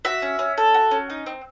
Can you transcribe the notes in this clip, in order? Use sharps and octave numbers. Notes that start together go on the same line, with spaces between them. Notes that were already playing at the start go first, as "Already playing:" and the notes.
F#4 E5
C#4
C#4
A4
F#4
C#4
D#4
C4